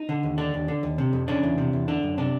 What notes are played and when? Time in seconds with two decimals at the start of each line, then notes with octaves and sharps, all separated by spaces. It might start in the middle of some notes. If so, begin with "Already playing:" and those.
Already playing: D#4
0.09 D3
0.23 D#2
0.38 D3 D4
0.54 D#2
0.68 D3
0.83 D#2
0.98 C3
1.13 F2
1.28 C#3 D4
1.43 E2
1.58 C3
1.73 E2
1.88 D3 D4
2.03 F#2
2.18 C3 D4